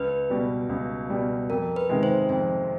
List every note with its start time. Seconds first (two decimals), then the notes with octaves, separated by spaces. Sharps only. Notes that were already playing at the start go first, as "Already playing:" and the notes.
Already playing: C#2 B4
0.30 B2 G3
0.69 C#2
1.10 B2 G3
1.50 F2 A#4
1.76 B4
1.89 C3 D#3 G#3
2.03 C5
2.29 F2 C5